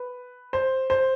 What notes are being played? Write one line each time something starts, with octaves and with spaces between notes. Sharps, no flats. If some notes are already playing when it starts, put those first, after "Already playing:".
Already playing: B4
C5
C5